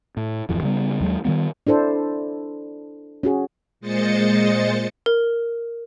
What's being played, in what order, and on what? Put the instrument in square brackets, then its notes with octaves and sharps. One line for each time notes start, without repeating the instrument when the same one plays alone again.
[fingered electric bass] A2
D1 F2 E3
C#3 G3 B3
D#2 F#3 G#3
D#3 F#3 G3 B3
[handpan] D4 E4 A4 C5
C#4 F#4 G#4
[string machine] A#2 G#3 C5 D#5 A6 C#7
[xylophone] A#4